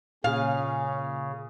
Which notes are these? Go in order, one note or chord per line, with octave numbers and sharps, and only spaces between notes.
A#2 C#3 C#4 G#4 F5